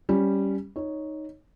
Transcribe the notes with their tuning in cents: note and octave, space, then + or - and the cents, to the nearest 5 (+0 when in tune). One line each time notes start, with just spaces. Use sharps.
G3 +0 C#4 +0
D#4 +0 C#5 +0